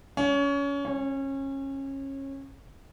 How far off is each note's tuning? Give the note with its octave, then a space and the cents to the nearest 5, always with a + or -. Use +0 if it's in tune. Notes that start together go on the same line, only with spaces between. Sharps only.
C#4 +25
C#4 -25